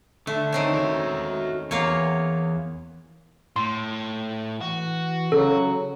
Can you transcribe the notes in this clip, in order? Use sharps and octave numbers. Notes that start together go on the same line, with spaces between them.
D3 A3
D#3 C4 C#4
F#4 E5
E2 A#3 F4 C#5
A2 C6
E3 F#4
C#3 F#3 A4